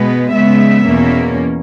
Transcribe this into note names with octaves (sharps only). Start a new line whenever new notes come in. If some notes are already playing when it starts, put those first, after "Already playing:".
Already playing: B2 G#3 B3
C#3 G#3 B3 E5
E2 B2 A#3 C#4